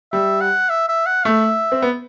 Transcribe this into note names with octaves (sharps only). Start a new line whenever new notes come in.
G3 E5
F#5
E5
E5
F#5
A3 E5
C4
B3